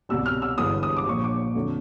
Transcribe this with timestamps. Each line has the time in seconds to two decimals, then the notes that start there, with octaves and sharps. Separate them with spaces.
0.09 C2 B2 G3 E6
0.26 F6
0.42 E6
0.58 G1 G2 E3 G#3 B3 D#6
0.83 D#6
0.97 D6
1.06 A#1 A#2 F3 C#6
1.24 D6
1.55 F2 D3 F#3 A3